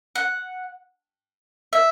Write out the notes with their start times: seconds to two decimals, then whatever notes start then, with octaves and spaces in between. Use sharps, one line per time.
0.15 F#5
1.73 E5